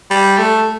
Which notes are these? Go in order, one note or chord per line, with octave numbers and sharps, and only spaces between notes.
G3
A3